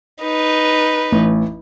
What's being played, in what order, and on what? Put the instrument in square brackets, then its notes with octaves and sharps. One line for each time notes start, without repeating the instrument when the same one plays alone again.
[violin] D#4 B4
[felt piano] A1